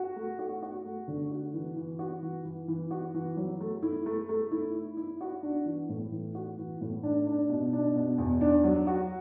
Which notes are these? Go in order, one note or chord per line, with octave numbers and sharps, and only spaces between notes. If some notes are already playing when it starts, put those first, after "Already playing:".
Already playing: F#4
A3
F#4
F#4
A3
D3
F#4
E3
E3
F#4
E3
E3
E3
F#4
E3
F#3
A3
E4
A3
A3
E4
E4
E4
F#4
D4
E3
A2
E3
F#4
E3
A2
D4
D4
B2
D4
B2
E2
D4
F#3
F#4